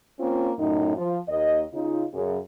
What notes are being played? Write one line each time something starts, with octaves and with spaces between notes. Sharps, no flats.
A#3 C4 C#4 F4
F#2 A2 D#4
F3 F4
D#2 D#5
C#3 D#4 F4
F#2 C#3